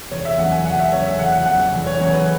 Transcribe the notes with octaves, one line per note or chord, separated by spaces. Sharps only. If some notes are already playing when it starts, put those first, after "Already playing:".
E1 C#5
E5
E2 C#3 F#3 F#5
G#5
E1 F#5
E5
E2 C#3 F#3 C#5
E5
E1 F#5
F#5
E2 C#3 F#3 F#5
E1
C#5
E2 C#3 F#3 C#5
B4